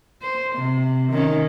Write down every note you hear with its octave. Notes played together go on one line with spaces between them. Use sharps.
C5
C3
D#3 C#4 D#4